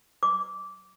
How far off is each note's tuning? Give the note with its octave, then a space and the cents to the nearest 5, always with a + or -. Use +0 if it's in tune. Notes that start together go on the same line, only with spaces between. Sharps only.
D6 -15